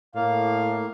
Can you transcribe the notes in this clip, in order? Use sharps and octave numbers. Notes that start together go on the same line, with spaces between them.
A2 A#3 F5